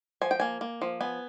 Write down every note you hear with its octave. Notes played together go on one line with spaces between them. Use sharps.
F3 G#5
G5
A#3 G#5
A#3
F3
B3 G#5